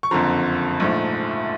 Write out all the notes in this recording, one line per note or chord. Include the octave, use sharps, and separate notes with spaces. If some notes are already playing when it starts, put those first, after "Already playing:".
C#6
F#1 F2 D3 F3 A#5 C6
A#1 G#2 F3 A3